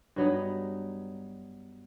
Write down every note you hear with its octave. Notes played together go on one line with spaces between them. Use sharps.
G2 F#3 B3 D#4